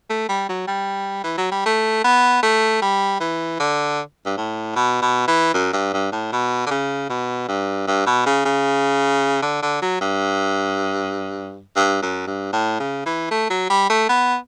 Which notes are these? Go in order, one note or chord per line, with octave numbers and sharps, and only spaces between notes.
A3
G3
F#3
G3
E3
F#3
G3
A3
B3
A3
G3
E3
D3
G2
A2
B2
B2
E3
F#2
G2
G2
A2
B2
D3
C#3
B2
G2
G2
B2
C#3
C#3
D3
D3
F#3
G2
G2
F#2
G2
A2
C#3
E3
A3
F#3
G3
A3
B3